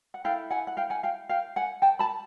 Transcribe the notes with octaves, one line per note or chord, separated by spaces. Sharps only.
F#5
E4 A4 F5 G5
F#5 G#5
F#5
F5 G5
F#5 G#5
F5 G5
F5 G5
F#5 G#5
G5 A5
A5 B5